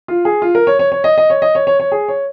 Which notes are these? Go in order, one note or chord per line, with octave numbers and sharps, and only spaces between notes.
F4
G#4
F4
A#4
C#5
C#5
C#5
D#5
D#5
C#5
D#5
C#5
C#5
C#5
G#4
C#5